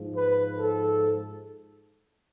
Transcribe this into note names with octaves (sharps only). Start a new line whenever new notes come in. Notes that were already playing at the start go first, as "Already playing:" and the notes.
Already playing: G#2 F3
B4
A4